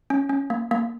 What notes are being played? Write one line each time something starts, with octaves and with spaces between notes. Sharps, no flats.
C#4
C#4
A#3
A#3